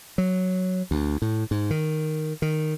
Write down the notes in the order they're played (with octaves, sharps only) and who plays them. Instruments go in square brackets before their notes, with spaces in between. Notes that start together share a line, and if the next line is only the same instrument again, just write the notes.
[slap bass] F#3
D2
A2
G#2
D#3
D#3